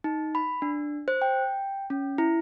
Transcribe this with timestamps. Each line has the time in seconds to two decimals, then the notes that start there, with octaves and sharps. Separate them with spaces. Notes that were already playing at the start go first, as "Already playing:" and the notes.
0.04 D#4
0.35 B5
0.62 D4
1.08 C5
1.22 G5
1.90 C#4
2.18 E4